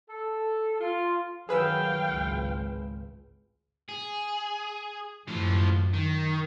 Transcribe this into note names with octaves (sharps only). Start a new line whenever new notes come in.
A4
F4
D#3 F#3 G#4 B4 F5 G5 E6
G#1 C#2
G#4
F#2 A2 F3
D#3